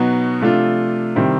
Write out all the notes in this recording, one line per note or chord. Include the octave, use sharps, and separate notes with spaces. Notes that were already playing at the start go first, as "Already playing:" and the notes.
Already playing: B2 F#3 B3 D#4 F#4
C3 F3 A3 D4 F4
C3 D#3 G3 C4 E4